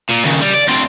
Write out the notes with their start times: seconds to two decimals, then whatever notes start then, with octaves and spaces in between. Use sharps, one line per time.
0.09 A#2
0.25 D#2 C#3
0.42 G3
0.55 D5
0.68 D2 C4